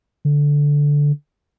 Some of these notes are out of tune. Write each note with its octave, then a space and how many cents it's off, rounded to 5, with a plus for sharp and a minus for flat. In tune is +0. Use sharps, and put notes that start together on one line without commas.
D3 -10